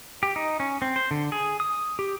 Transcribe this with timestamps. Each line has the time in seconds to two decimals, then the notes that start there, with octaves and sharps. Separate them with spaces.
0.23 G4
0.36 D#4
0.60 C#4
0.82 C4
0.96 C5
1.11 D3
1.32 G#4
1.60 D#6
1.99 G4